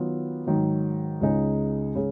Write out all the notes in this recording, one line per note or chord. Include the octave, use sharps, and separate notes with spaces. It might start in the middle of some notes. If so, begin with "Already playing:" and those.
Already playing: D#3 F#3 B3 F4
G#2 D#3 F#3
C#2 C#3 G#3 D#4 G#4
C#3 G#3